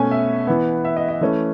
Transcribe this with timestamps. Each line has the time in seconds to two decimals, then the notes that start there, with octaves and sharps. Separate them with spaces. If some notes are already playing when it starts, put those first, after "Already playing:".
Already playing: B2 A3 C#4 G#5
0.11 E5
0.47 E3 B3
0.85 E5
0.96 D#5
1.09 D#5
1.21 E3 A3 C#4